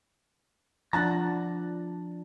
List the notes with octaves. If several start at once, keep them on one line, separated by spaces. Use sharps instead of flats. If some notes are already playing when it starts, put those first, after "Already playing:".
F3 D4 F#5 A5 A#5